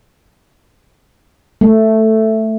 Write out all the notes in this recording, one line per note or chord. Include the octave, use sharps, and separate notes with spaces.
A3